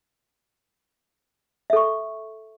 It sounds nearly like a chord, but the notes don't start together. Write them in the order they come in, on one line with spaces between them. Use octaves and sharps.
E5 A4 C#6